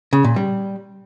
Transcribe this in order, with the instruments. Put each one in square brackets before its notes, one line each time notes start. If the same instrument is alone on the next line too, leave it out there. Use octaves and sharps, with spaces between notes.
[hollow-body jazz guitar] C#3
A#2
G3